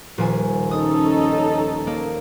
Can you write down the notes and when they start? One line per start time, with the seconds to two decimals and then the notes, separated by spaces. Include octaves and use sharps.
0.18 D#1 F3 G#5
0.71 C#4 D#4 A4 D#6
1.87 A#3